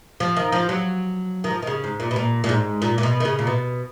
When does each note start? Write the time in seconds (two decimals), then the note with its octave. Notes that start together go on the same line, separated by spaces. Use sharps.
0.20 F3
0.36 D#3
0.52 F3
0.69 F#3
1.44 D#3
1.51 F3
1.63 D#3
1.67 C#3
1.84 G#2
2.00 A#2
2.11 B2
2.16 A#2
2.44 A#2
2.49 G#2
2.82 A#2
2.98 A#2
3.03 B2
3.20 D#3
3.25 C#3
3.39 A#2
3.47 B2